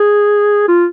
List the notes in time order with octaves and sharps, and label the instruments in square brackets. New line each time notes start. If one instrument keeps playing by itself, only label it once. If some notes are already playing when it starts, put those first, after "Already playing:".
Already playing: [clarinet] G#4
F4